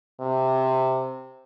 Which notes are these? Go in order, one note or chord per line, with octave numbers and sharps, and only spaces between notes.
C3